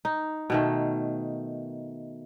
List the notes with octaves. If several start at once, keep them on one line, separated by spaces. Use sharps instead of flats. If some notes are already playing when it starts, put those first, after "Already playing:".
D#4
B2 D#3 A3